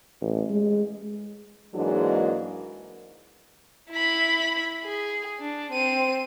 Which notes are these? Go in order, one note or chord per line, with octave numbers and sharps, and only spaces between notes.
A1
G#3
G#2 E3 F#3 G#3 A#3 D4
E4 B5
G#4
D4
C4 D#7